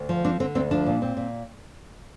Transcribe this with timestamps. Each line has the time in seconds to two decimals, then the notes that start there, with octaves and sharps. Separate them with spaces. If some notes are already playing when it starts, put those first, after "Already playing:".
Already playing: D2
0.09 F3
0.24 C4 D4
0.40 D3 C4
0.55 D2 C4
0.71 F3 D4
0.86 A#2
1.02 C4
1.17 A#2